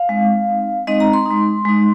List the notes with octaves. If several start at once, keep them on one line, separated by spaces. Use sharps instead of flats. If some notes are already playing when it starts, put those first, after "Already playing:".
Already playing: F5
G#3 C4 D#4
G#3 C4 D#4
G#3 C4 D#4 D#5
A#5
C6
D#4
G#3
G#3 D#4